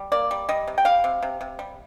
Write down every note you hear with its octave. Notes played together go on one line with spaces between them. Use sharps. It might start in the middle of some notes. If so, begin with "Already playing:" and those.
Already playing: G3
A#3 D5
G3
G3 D#5
C3
G5
G3 F5
C3
C3
C3
G3